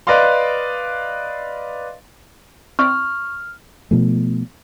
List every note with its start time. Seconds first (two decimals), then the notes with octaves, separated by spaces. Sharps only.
0.07 B4 D5 D#5 F5 C6
2.79 C4 E4 D5 C#6 F6
3.91 B2 F3 A3